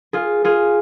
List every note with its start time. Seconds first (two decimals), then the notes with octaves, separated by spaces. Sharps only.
0.13 F4 G#4
0.44 F4 G#4